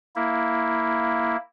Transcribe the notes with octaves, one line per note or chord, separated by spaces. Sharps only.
A#3 E4